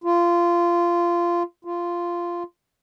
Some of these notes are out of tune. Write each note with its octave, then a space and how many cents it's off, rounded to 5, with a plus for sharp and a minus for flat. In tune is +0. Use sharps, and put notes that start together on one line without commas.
F4 -15
F4 -10